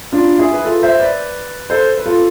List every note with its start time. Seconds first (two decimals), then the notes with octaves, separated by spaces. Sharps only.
0.12 D4 F4
0.39 E4 G#4
0.53 B4
0.65 F4 A4
0.83 C5 E5
1.00 B4 D5
1.70 A4 C5
1.98 B4
2.06 F4 A4